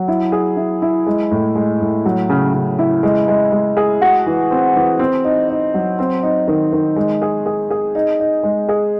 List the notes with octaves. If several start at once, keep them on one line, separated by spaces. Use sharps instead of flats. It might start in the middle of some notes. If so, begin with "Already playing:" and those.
Already playing: F#3
E4
G#4
E4
E4
G#3
A2
G#3
A2
F#3
C#3
C#3
E4
G#3
G#3
G#3
G#4
F#4
E3
C4
E3
C4
D#4
D#4
F#3
C4
D#4
D#3
D#3
G#3
G#4
G#4
G#4
D#4
D#4
G#3
G#4